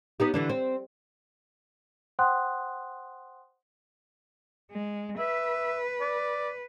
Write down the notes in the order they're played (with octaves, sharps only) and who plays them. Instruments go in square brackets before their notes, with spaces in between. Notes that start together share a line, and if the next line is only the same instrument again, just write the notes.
[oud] B3 D#4 G4
D3 E3 D4
C4
[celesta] C5 F#5 G5 C6 D#6 F#6
[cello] G#3
[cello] B4 [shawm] E5
[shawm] D5